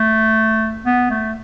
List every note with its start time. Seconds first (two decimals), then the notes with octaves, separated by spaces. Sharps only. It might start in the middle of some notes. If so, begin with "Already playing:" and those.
Already playing: A3
0.86 B3
1.10 A3